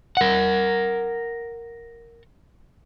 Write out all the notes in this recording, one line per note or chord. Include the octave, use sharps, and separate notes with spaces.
A#4 F#5